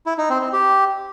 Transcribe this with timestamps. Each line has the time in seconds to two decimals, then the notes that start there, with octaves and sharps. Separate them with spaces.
0.06 E4
0.18 D#4
0.30 C4
0.41 C4
0.53 G4